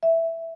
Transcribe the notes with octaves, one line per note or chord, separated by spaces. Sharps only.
E5